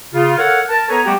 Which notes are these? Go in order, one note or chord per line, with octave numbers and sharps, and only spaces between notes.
C#3 F4
A4 A#4 C#5 F5 F#5
A#4 A5
B3 A4 B4 C#5 G#5 A#5
G3 A3 B3 F#4 G4